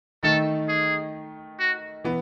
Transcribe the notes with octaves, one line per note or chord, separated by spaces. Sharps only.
D#3 A3 D#4 A4
G#4
F#4
E3 B3